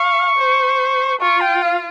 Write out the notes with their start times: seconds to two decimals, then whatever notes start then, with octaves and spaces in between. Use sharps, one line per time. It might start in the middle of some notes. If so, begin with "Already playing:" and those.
Already playing: F5 C#6
0.38 C5
1.20 F4 C#6
1.41 G5
1.62 F5